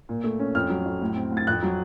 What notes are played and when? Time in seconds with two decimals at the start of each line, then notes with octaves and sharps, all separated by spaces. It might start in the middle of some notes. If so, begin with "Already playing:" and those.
0.09 A#2
0.24 A3
0.39 C#4
0.55 F2 F6
0.70 F#3
0.86 F2
1.02 A2
1.16 C4
1.32 A2
1.37 A6
1.47 F2 F#6
1.62 F#3